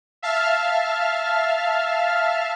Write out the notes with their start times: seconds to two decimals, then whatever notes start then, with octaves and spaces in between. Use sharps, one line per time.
0.22 E5 F5 A5 F6